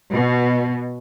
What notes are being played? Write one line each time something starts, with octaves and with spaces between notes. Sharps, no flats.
B2